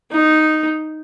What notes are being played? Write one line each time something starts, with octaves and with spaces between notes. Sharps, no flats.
D#4